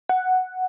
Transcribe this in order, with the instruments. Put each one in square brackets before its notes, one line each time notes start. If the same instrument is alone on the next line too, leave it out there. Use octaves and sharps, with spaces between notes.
[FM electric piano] F#5